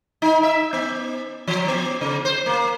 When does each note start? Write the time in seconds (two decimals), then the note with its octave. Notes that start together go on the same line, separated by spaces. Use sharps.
0.22 D#4
0.43 E5
0.73 B3
1.47 F3
1.68 B3
2.01 C#3
2.25 C5
2.46 A#3